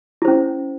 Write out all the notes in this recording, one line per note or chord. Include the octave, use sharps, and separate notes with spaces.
C#4 E4 C5